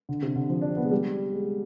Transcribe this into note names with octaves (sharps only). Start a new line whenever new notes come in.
D3
C3
D3
F3
D4
C4
B3
G#3
G3
G#3